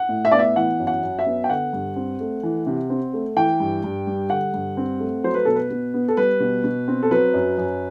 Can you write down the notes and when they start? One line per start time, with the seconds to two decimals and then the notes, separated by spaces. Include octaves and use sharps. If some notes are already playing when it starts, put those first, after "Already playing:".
Already playing: F#5
0.09 A2
0.25 E5
0.32 B3 D5
0.39 E5
0.56 E3 F#5
0.80 F#2
0.87 F#5
1.03 F#2
1.19 E5
1.26 B3
1.44 G5
1.49 D3 F#5
1.73 G2
1.96 C4
2.20 A3
2.43 E3
2.67 C3
2.90 C4
3.13 A3
3.37 E3 G5
3.60 G2
3.84 G2
4.07 G3
4.30 D3 F#5
4.54 G2
4.77 C4
5.00 A3
5.24 F#3 C5
5.34 B4
5.45 B2 A4
5.56 B4
5.70 B2
5.94 B3
6.08 A4
6.17 G3 B4
6.40 B2
6.64 B2
6.88 C4
7.03 A4
7.11 F#3 B4
7.34 F#2
7.58 F#2